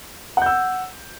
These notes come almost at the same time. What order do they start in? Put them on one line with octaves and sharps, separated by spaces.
F#5 G6 E6